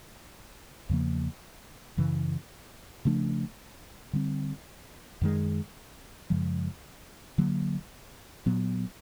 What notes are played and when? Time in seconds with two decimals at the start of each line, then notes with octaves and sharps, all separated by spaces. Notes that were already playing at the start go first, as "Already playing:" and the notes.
0.89 E2 C#3 F3 A#3
1.97 F#2 C#3 E3
3.05 C#3 F3 A3 D4
4.13 D3 G3 C4
5.21 F#2 D#3 G#3
6.30 F#2 C#3 F3 G#3
7.38 D3 F#3 A#3
8.46 A#2 F#3 B3